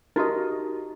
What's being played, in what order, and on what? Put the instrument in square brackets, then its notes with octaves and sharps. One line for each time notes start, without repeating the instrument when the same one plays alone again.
[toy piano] D#4 F#4 G4 [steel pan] A#4 D#5